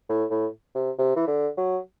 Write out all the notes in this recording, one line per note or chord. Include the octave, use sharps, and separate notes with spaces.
A2
A2
C3
C3
E3
D3
F#3